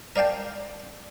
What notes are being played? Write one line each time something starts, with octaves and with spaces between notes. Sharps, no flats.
A#4 D5 F5 G5 A5